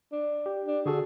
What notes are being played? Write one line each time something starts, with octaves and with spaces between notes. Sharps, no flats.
D4
G4
D4
D3 F#4 G#4 A4